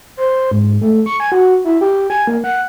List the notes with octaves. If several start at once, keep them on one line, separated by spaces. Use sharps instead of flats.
C5
G#2
A3
C#6
G#5
F#4
E4
G4
G#5
A#3
F#5